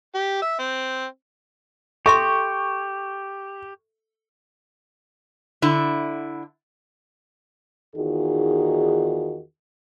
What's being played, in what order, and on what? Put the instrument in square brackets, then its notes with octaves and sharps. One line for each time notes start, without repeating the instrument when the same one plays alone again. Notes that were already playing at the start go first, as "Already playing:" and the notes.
[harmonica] G4
E5
C4
[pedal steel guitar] G4 [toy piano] A4 E5 C6 [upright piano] C#6
[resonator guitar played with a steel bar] D3 E4
[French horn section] E2 D#3 D#4 F4 F#4 G#4